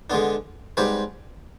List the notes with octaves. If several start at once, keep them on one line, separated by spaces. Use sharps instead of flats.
D3 G#3 B3 D4
G#2 G3 C4 G4 B4